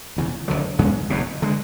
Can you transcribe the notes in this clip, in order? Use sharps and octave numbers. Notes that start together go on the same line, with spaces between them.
E1 E2 C#3
E1 D2 D3 F#3
E2 C#3 G#3 B3
F#1 E2 B2
D3 G#3